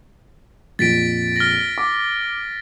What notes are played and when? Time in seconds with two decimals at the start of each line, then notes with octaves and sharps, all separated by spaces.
0.79 A#1 F2 A6 B6 D7
1.36 F6 A#6
1.78 D6